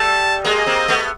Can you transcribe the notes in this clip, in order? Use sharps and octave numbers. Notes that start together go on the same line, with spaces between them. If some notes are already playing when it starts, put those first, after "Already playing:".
Already playing: G3 A3 A5
G#3 A#3 D#5
A#3 C4
A3 B3